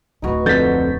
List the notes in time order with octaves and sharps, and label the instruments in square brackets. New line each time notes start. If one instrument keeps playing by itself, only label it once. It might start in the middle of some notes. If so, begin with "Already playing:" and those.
[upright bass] D1 D2 [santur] D#4 F#4 B4
[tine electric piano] F2 B6 [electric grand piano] D3 G6 A6